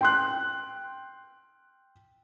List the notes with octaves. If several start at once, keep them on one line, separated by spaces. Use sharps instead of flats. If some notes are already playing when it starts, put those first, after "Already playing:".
G5 C6 F#6